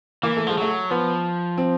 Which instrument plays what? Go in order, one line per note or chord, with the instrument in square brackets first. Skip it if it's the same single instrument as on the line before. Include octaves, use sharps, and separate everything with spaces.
[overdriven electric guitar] E3 [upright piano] A#3
[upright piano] A3
[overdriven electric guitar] F3 [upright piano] G#3
[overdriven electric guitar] F#3 [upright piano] A3
[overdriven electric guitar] F3 [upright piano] B3
[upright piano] C4